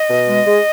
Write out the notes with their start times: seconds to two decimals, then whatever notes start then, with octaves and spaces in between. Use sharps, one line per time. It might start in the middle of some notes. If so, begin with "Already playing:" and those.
Already playing: D#5
0.10 B2
0.28 G#3
0.46 G#3